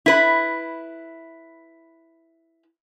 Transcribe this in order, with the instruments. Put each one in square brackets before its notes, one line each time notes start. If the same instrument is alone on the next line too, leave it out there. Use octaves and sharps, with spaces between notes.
[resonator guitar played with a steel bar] E4 B4